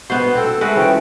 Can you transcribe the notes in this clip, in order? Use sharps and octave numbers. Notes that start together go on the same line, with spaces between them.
A#1 B2 B3 F#4 C5
C4 A4
G#3 A3 F#4 B4 D#5
E3 F3 C#4 G5